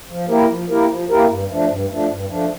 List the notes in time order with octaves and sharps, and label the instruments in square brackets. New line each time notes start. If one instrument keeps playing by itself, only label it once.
[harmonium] F3
A#3 E4 G4 A#4
F3
A#3 E4 G4 A#4
F3
A#3 E4 G4 A#4
G2
F3 A3 D4
G2
F3 A3 D4
G2
F3 A3 D4